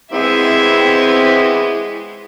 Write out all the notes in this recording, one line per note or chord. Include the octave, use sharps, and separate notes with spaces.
E3 G#3 B3 C4 E4 E5